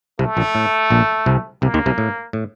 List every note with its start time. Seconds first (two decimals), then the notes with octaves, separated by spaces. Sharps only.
0.19 C2 C3 A3
0.37 A#1 A#2
0.55 A2
0.90 A#1 A#2
1.26 C2 C3
1.62 C2 C3 A#3
1.74 D#2 D#3
1.86 C2 C3
1.98 A2
2.33 A2